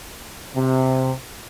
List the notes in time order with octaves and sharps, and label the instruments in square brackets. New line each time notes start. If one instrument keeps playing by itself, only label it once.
[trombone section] C3